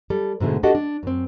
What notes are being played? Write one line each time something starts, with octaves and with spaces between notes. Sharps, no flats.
G3 A4
G#2 B2 D3 A3 G#4
D4 F#4 G4 A4 D#5 F#5
D4
F#2 C4